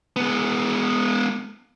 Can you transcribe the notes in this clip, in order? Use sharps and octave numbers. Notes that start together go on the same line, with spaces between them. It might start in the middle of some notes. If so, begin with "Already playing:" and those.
G#3 B3